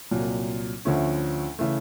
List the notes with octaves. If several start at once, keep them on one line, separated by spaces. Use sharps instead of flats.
C2 A#2 F#3
D2 D3 F3 A3 C#4
C#3 E3 A3